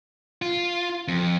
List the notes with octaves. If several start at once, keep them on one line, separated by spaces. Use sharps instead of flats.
F4
F2